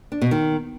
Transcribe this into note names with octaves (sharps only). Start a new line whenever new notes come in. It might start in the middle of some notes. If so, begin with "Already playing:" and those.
D4
B2
D#3